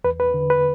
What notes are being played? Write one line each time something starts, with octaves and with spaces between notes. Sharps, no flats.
E2 B4
B4
D3
B4